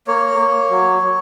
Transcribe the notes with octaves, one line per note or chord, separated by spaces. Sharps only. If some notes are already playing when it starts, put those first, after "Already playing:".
A#3 C#5
A#3
F#3
F#3